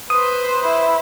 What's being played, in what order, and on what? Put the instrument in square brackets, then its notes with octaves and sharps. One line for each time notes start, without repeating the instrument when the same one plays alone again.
[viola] B4 C5 [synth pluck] D#6
[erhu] E4